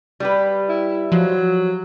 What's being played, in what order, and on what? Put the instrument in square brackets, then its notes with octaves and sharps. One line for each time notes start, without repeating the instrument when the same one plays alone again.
[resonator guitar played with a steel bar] G3 G4 B4
[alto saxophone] E4
[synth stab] F3 [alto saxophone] F#3